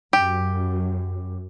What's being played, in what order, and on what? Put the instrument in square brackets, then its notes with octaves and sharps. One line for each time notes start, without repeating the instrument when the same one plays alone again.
[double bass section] F#2 [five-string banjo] G4